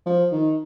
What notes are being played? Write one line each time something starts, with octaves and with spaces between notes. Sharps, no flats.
F3
D#3